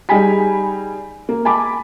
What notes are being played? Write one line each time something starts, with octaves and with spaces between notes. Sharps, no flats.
G3 D#4 G#4 G#5 B5 B6
A#3
G#5 A5 B5 D6